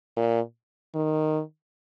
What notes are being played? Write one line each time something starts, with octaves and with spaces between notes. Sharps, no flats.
A#2
D#3